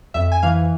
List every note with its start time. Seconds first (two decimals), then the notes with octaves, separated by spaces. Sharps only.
0.14 F2 E5
0.32 G#5
0.43 E3 F5